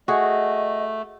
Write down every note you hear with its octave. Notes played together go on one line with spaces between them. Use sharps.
A3 F#4 G#4 D#5